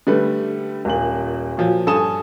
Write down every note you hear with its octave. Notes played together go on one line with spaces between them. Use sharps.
D3 G3 A3 B4
D#1 A#2 F#7
A#2 F3 F#3
G2 A4 G#5 D#6 E7